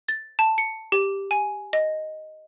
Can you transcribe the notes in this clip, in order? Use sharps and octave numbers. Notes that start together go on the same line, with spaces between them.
A6
A5
C#7
G4
G#5
D#5